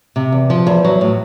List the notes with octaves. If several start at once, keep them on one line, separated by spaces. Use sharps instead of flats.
C3
E2
F3
E2
F#3
A2